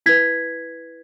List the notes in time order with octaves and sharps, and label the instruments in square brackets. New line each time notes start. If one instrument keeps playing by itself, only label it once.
[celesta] E4 B4 G#6 B6